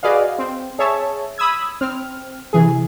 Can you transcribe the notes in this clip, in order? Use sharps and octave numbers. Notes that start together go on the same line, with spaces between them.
F#4 G#4 B4 D5 D#5 F5
C4
G#4 C#5 E5 A5
B5 D#6 E6 G#6
C4 F6
C3 E3 G#4